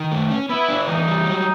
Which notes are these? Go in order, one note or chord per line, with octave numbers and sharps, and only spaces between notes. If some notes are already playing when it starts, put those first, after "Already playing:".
Already playing: D#3
A3
C#4
B3 E4
D4
E3 D#4
G3
F#3